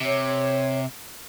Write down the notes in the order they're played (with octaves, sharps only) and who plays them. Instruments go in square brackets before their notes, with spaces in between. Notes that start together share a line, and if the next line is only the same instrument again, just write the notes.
[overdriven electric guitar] C3 [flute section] C#5